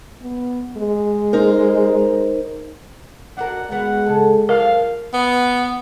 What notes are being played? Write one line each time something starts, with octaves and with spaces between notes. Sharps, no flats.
B3
G#3
D#4 A#4 C5
D4 F#4 A#4 F#5
E2 G#3 B3 F#4 F#5
C#3 A4
F#2 F3 A#4 F5
B3